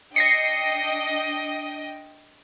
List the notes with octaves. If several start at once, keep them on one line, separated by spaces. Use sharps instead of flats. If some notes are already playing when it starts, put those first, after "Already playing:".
D4 D#5 G5 A#6 C7 C#7